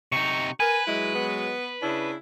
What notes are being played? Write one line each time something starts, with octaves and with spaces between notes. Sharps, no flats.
C3 D#4 C#6
A#4 B4 G#5
F#3 G#3 E4
B3
C#3 D4 E4